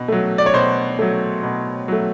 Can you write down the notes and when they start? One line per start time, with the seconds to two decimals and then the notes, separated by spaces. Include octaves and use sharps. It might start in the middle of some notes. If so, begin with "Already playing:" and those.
Already playing: B2
0.08 F#3 A3
0.38 D5
0.46 C#5
0.53 B2 C5
0.99 F#3 A3
1.43 B2
1.88 F#3 A3